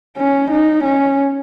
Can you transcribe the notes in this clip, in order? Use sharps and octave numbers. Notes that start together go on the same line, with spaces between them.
C#4
D#4
C#4